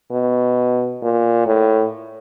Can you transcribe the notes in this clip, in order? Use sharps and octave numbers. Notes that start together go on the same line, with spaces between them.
B2
A#2
A2